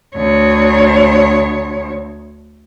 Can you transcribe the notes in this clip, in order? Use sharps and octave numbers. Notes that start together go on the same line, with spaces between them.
D2 C#5